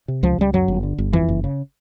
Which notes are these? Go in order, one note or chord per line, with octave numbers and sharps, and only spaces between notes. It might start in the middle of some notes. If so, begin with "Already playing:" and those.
C3
C#2 F3
C#2 G3
F#2 F#3
G1
D3
G1
F2 E3
F#1
C#3